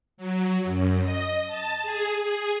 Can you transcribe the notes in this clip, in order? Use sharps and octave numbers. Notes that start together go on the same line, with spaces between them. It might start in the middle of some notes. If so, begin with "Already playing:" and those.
F#3
F#2
D#5
A5
G#4
G#4